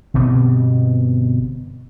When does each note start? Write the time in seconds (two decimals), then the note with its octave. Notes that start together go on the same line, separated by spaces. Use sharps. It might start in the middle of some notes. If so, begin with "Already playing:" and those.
0.14 G1 B2 B3 C4